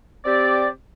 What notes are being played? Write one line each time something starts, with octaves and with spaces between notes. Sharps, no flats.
C4 G4 D5